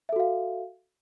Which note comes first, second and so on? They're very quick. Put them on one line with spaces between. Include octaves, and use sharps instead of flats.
E5 A4 F#4 F5